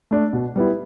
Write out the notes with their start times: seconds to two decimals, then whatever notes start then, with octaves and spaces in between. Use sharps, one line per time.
0.11 A3 D4
0.33 B2
0.56 G3 B3 E4